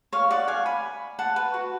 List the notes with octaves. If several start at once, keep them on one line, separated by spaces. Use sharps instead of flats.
C#5 F5
D5 F#5
F5 G#5
G#5 B5
F#5 A5
B4
F#4